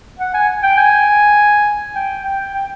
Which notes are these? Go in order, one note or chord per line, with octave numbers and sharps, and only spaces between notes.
F#5
G#5
G5
G#5
G5
G5
G5